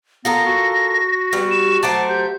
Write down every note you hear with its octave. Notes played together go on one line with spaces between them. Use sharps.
B3 F4 A4 A#4 A#6
F#4
G3 B3
E7
F#3 A3 C5 A5 D6
G4 G6